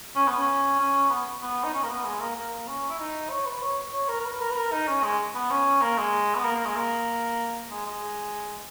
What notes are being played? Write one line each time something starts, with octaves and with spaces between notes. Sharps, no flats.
C#4
B3
C#4
C#4
B3
B3
D#4
C#4
A#3
B3
G#3
A#3
A#3
C#4
E4
D#4
C#5
B4
C#5
C#5
A#4
A#4
B4
A#4
B4
A#4
D#4
C#4
G#3
B3
C#4
A#3
G#3
B3
A#3
A#3
G#3
A#3
G#3
G#3